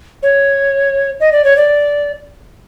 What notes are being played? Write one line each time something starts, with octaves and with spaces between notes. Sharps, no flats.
C#5
D#5
D5
C#5
D5